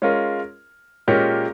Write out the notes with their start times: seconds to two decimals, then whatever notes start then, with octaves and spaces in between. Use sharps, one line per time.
0.02 G#3 C#4 F4 A#4
1.08 A#2 G#3 C#4 G4 A#4